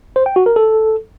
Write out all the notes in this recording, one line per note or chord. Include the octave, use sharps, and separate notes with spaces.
C5
G5
F#4
A#4
A4